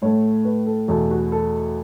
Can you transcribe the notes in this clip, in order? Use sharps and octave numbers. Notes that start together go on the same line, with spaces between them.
A2 A3 C#5
B4
A4
E2 B2 A3 A4
F#4
A4